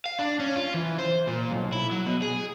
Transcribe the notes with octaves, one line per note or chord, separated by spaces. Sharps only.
F5
D4
C#4
F4
E3
C5
A#2
B1
E4
F#3
B2
G#4